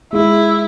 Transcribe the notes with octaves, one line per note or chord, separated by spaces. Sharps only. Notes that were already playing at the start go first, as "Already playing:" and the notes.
G#3 E4